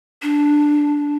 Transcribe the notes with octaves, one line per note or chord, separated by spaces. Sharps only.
D4